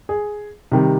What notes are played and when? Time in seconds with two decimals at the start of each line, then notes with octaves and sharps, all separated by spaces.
0.09 G#4
0.72 C3 D#3 G3